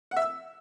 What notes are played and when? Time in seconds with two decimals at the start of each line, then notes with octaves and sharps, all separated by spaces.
0.11 F#5
0.17 E5
0.22 E6